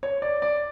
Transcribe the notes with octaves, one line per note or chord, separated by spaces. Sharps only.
C#5
D5
D5